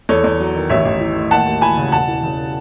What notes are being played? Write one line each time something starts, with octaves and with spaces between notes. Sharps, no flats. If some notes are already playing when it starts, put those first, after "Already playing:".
E2 A4 C#5
E2
F#3
D#3
A1 C#5 E5
A1
E3
A2
D#2 F#5 A5
D#2
E3 G#5 B5
C#3
E1 F#5 A5
E3
C#3